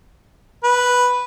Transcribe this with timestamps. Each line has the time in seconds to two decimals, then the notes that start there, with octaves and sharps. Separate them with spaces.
0.64 B4